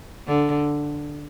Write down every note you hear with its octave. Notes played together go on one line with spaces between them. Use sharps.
D3